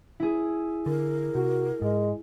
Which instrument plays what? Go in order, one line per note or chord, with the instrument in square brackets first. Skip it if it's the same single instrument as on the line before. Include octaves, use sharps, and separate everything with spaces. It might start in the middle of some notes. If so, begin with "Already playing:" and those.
[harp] E4 G#4
[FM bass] D3 [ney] A#4
[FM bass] C3 [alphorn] F#4
[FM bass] G#2 [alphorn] G#3